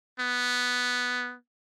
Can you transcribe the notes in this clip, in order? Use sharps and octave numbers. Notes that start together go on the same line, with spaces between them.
B3